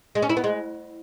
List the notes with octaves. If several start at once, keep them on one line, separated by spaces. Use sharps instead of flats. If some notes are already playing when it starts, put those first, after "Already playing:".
G#3
C#4
E4
B3
G#3